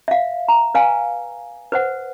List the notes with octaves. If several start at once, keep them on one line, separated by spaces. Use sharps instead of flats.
E5 F5
A#5
B4 F5 G#5
B4 C5 F#5